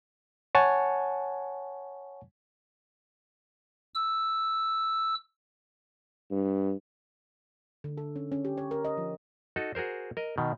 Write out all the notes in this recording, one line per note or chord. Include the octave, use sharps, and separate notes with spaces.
C#5 F#5 G#5 A5 C#6
E6
G2
D3
A4
C#4
C#4
G4
C#5
A#4
D#5
F3
D#4 F#4 A4
F#4 G#4 A#4 C5
A#4 D#5
B2 D#3